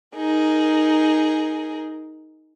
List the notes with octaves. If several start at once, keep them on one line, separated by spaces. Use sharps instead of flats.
D#4 G#4 A#4